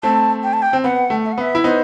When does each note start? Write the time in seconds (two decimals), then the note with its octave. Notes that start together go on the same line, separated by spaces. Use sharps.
0.03 A3 C4 A5
0.43 G5
0.53 A5
0.62 G5
0.73 C4
0.84 B3 F#5
1.10 A3
1.25 E5
1.32 F#5
1.38 B3 E5
1.55 E4
1.64 B3 D#4 C5